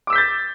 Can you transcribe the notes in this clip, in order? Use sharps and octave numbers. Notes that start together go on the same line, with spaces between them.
D6 E6 G6 A6 B6